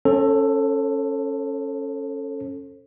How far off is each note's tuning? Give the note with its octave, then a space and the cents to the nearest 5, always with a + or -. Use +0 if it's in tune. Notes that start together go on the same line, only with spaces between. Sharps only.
C#4 -15 A4 +10 C5 +40